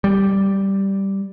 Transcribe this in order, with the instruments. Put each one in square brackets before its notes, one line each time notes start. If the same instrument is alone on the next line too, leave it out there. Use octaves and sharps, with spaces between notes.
[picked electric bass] G3